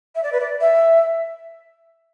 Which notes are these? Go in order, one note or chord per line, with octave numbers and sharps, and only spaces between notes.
E5
D5
B4
D5
E5